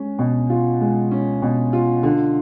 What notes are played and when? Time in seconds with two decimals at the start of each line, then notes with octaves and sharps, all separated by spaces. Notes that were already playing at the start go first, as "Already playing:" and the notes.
Already playing: G#3 C#4
0.19 B2
0.50 F4
0.81 G#3
1.11 C#4
1.42 B2
1.73 F4
2.03 D3